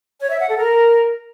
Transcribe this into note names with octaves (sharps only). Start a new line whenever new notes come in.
C#5
E5
F#5
A4
A#4